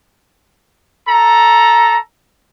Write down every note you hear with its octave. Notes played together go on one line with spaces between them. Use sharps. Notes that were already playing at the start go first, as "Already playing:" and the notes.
A4 A#5